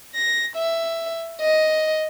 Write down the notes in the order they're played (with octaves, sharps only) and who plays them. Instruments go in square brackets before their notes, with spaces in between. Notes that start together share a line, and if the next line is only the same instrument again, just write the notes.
[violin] A#6
E5
D#5